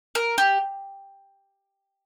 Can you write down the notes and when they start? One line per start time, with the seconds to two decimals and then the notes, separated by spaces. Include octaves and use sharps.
0.15 A#4
0.38 G4